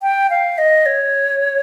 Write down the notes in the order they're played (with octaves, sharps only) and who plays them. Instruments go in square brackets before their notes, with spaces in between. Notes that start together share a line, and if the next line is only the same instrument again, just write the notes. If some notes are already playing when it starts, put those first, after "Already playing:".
[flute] G5
F5
D#5
C#5